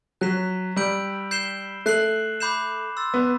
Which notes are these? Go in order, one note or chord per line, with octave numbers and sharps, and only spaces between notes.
F#3 F#6 B6 E7
G3 E6 G6 D7 F#7
G6 C7 E7 G7
A3 F#6 C7 F#7
B5 D6 G6 C7 E7
C6 E6 A6
B3